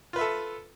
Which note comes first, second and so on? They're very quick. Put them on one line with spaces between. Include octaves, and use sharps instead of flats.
F4 B4 E5 A4